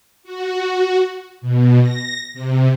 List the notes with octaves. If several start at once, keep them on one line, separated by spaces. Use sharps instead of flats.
F#4
B2
A#6
C3